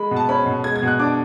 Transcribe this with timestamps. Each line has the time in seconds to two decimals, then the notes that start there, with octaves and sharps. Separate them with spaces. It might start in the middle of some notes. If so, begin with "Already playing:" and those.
Already playing: G#3 B5
0.11 B2
0.16 A5
0.29 C#4 B5
0.46 B2
0.64 G#3 G#6
0.76 G#6
0.82 B2
0.88 F#6
0.99 D4 D6